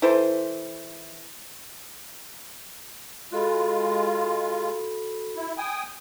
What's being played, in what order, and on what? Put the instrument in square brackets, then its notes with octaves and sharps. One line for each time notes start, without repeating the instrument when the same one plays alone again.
[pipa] E3 E4 A4 C5
[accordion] G#3 F4 [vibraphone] F#4 A4 B5
[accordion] E4
G5 G#5 D#6